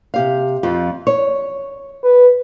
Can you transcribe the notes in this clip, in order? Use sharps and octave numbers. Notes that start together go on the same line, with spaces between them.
C3 G4 F5
F2 F3 C4
C#5
B4